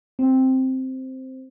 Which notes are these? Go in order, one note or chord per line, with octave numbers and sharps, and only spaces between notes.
C4